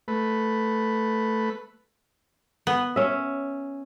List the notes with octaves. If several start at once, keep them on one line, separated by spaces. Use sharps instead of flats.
A3 B4
B3
C#4 E5